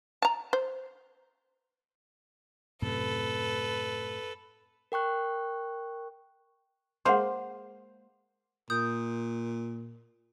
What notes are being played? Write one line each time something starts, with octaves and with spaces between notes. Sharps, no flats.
A5 A#5
C5
F#2 A2 C3 A4 B4
A#4 G5 C#6 F#6
G#3 A#3 C5 F#5 C6
A#2 D#6 G6